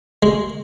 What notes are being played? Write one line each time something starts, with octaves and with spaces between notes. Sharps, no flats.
G#3